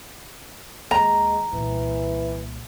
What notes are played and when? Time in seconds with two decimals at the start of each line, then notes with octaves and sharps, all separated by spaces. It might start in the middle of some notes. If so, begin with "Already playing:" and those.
0.91 D#2 G#3 A#5
1.52 C2 A#2 E3